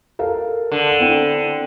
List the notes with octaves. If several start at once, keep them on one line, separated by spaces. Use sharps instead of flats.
A4 A#4 F5
D3
C4 E4 G5